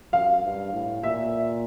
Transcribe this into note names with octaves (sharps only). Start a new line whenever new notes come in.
F#2 F5
G2
A2
A#2 E5